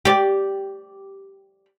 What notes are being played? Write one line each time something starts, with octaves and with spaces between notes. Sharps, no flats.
G4 D5